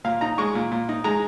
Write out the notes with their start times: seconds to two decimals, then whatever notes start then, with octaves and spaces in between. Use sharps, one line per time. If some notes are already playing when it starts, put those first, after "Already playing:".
0.04 A#2 F5
0.21 D#4 A#5
0.38 G#3 C#6
0.55 A#2
0.71 A#2
0.89 D#4
1.04 G#3 A#5